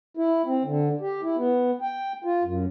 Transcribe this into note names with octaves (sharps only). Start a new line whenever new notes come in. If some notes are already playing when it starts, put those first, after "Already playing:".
E4
C4
D3
G4
E4
B3
G5
F4
F#2